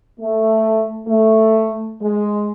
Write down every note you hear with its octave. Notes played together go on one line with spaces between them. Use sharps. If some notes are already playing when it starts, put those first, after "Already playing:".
A3
A3
G#3